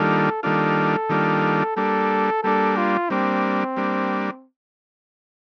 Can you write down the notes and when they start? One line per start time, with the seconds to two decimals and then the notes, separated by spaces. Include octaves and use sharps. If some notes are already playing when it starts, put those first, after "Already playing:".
Already playing: D#3 G3 A#3 D4 F4 A4
0.43 D#3 G3 A#3 D4 F4 A4
1.09 D#3 G3 A#3 D4 F4
1.76 G3 A#3 D4 A4
2.43 G3 A#3 D4 A4
2.77 F4
3.10 G3 A#3 C4 D4
3.77 G3 A#3 D4